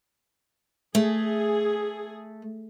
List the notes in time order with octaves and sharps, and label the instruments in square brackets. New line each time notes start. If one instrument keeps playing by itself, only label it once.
[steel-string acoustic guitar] A3 [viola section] G#4